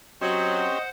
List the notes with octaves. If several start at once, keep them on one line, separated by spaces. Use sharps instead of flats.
F#3 C4 C#4 G4 C5 D#5 F#5